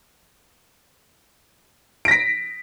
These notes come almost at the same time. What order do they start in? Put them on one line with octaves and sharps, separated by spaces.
D7 A#6 B6